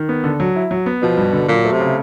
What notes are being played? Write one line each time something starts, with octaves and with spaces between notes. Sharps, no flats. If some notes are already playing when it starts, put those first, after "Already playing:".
Already playing: D#3
B3
D3
F#3
E4
F#3
B3
B2 F3
G2
D3
A#2 F#3
A3
C3
C#3